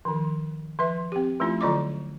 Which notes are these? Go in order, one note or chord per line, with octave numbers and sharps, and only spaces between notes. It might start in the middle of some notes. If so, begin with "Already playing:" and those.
D#3 F3
F3 B4 E5
C4 G4
F3 A3 C#4 E4 F4
D3 F#3 F4 D5 D#5 D6